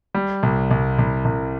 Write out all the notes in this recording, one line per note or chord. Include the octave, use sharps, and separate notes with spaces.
G3
C2
C2
C2
C2